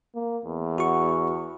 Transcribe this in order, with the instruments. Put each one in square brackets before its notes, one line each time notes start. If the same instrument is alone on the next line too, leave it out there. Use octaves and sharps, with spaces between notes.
[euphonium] A#3
E2
[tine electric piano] F#4 C#6